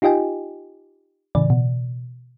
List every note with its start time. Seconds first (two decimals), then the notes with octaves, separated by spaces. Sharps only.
0.02 D#4 F4 G4 D#5 G5 G#5
1.35 A2 C#3 E3 D5
1.50 B2